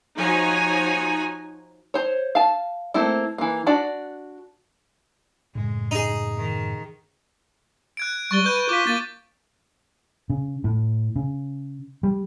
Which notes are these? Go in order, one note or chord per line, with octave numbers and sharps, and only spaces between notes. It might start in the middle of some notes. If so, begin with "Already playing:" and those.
F3 D#4 F#4 C#5 G#5 A#5
C5 C#5
F5 A5
A3 A#3 C4 E4
E3 A#3
D4 F#4 D5
F#2 A2 C#3 G#3
D#4 G#4
D#3
F#6 G#6 D7
G3 C#6 A6 G7
B4 C#6 G6 D#7
F4 D6 B6
A#3 A6
C#3
A2
C#3
G3